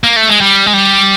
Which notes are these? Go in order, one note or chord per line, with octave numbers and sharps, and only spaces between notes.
A#3
A3
G#3
G3
G#3
G3